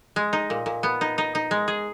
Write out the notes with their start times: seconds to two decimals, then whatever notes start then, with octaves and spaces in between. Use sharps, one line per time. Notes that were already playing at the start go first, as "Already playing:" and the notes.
0.16 G#3
0.33 D#4
0.50 A#2
0.66 A#2
0.83 B3
1.01 D#4
1.18 D#4
1.35 D#4
1.51 G#3
1.68 G#4